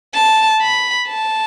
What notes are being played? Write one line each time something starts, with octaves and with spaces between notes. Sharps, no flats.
A5
B5
A5